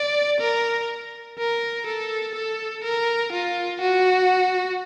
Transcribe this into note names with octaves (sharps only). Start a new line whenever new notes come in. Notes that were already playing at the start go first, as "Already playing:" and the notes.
Already playing: D5
A#4
A#4
A4
A4
A#4
F4
F#4